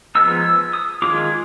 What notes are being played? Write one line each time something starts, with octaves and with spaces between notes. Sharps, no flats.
F3 G#3 B3 D#4 E6
E6
D#6
D#3 G#3 C#4 F4 D6